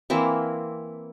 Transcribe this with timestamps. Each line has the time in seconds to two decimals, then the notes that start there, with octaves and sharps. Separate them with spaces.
0.10 E3 A#3 C4 E4